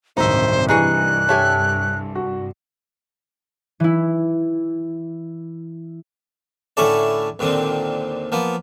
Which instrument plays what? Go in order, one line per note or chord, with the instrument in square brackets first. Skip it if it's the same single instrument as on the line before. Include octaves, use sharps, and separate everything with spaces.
[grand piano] D1 D#3 [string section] C2 G2 [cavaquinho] D#4 E5 [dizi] C5
[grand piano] E3 G3 [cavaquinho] D#4 G#4 C#6 [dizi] F#6
[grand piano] G4 C#5 [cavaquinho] A4 E5 G#5
[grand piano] F#4
[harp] E3 E4
[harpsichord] A2 D3 C#4 E4 A4 D5
D#2 A#2 D3 C4
F3 A#3 B3